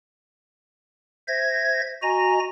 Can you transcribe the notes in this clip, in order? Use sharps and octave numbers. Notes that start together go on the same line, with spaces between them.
C5 E5 G#6 A#6
F#4 D#5 G#5 A#5 A#6